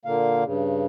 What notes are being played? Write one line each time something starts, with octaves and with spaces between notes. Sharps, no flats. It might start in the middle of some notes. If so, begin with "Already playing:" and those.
A#2 D3 A#3 F5
G2 C#3